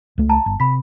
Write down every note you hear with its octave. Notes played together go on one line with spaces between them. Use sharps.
C#2 A3
A5 A#5
G1
C3 B5 B6